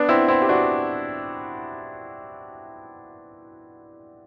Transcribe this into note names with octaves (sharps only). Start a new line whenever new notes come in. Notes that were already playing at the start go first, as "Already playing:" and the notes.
Already playing: B3 D4
C4 E4
C4 E4
G4
D4 F#4